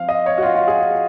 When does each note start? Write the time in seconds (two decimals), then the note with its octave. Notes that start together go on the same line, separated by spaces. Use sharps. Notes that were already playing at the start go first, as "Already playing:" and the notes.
Already playing: F3 C4 F5
0.09 D#5
0.26 C#5
0.38 F#4
0.43 F4
0.55 F4
0.68 G#4